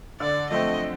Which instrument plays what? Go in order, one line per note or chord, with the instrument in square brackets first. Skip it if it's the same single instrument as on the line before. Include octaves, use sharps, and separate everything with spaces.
[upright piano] D3 [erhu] D5
[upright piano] F3 A3 C4 [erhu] D#5